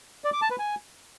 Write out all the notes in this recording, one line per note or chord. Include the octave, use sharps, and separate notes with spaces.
D5
D6
A5
B4
G#5